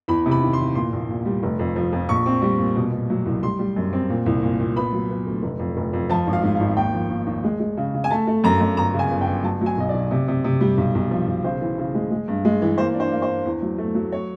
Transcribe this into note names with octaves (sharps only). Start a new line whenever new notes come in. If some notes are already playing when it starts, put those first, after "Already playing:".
E2 B5
C3
B5
D#3
C6
E2
A#2 C6
A#1
A#2
G3
F1
F2
F3
F2
A#1 C#6
C4
G3
A#2
B2
B2
F#3
C2
G3 C6
G3
F#2
C4
A#2
C2
A#2
A#2
B3 B5
F#3
B3
D2
F1
F2
F1
F2
F3 A5
G#1
F5
G#2
F5
G#1
D#2 G5
F3
D#2
D#2
G#3
G#3
C#3
C#3
G#5
A3 A5
A3
F#2 A#5
F#2
G1 A#5
C#3
G#5
G1
G5
G1
F#3 A5
F#3
G#5
B1 D#5
B1 D5
C3
C3
C3
G3
B1
B1
F3
B1
C#3 C5
E3
C#3
G#3
G#3
G2
G#3
E3
A#3 C5
D4
C5
A#3
C5
D4
E2
F#3
A3
F#3
C#5